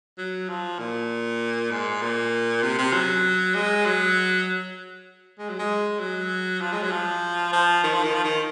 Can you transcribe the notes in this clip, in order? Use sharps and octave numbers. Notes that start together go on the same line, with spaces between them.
F#3
F3
A#2
G#2
A#2
C3
C3
F#3
G#3
F#3
G#3
F#3
G#3
F#3
F3
G#3
F#3
F3
F3
D#3
F3
D#3
F3
D#3